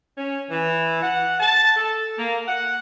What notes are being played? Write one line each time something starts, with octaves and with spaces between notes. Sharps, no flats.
C#4
E3
F#5
A5
A4
A#3
F#5